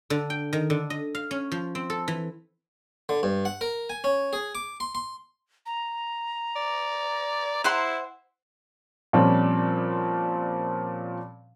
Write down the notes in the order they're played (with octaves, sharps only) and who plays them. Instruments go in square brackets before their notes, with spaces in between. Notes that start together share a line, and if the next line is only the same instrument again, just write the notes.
[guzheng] D3
G5
D#3
D3
D#5
F5
C#4
F3
C4
A4
E3
[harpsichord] D3
G2
F#5
A#4
G#5
C#4
G#4
D6
C6
C6
[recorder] A#5
[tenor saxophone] D5
[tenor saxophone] E4 [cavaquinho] C5 F#5 C6
[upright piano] A#2 F3 G3 C4 C#4